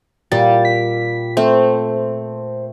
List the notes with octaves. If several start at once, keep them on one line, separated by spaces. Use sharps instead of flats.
A#2 G3 A6
B6
A3 C4 C5